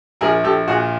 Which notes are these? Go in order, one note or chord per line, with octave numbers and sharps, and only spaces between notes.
A#1 G#4 A#4
A#1 G4 A4
A#2 F#4 G#4